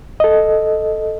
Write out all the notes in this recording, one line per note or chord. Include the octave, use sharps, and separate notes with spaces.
A4 D#5